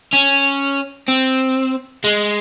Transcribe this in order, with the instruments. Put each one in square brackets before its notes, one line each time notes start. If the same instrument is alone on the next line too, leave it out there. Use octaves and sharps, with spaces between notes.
[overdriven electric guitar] C#4
C4
G#3